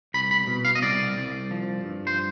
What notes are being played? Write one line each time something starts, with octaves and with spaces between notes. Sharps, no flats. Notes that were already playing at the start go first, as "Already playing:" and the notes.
C2 B5
B5
B2
F5
D#5
C2 D5
C2
F3
G2
C5